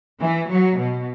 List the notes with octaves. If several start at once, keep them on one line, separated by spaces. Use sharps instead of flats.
E3
F#3
B2